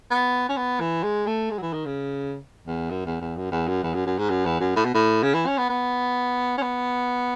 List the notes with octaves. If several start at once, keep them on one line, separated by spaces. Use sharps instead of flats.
B3
C#4
B3
E3
G#3
A3
G#3
F#3
E3
D#3
C#3
E2
F#2
E2
E2
F#2
E2
F#2
E2
F#2
F#2
G#2
F#2
E2
F#2
A2
B2
A2
C#3
E3
C#4
B3
B3
C#4
B3